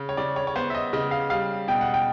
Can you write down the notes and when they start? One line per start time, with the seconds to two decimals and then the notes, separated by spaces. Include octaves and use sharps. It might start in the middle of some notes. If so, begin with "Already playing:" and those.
Already playing: C#3
0.09 C#5
0.17 C#3 D5
0.36 C#5
0.47 C#5
0.56 B3 C5
0.70 E5
0.75 D#5
0.93 C#3 D#5
1.11 F5
1.30 G3 F5
1.68 B2 G5
1.81 F#5
1.94 G5